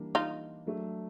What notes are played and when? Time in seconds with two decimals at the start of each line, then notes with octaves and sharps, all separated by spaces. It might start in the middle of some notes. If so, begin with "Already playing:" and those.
Already playing: E3 G3 A#3 D4
0.15 D#4 F4
0.66 F#3 A3 D4